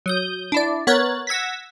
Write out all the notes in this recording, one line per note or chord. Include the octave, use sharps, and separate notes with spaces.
F#3 D#6 G6
D4 E4 D5
B3 A#4 C#5 F#6 A6
F#5 E6 G#6 A#6 B6